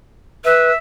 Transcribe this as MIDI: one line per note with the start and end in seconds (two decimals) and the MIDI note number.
0.45 0.71 71
0.45 0.75 76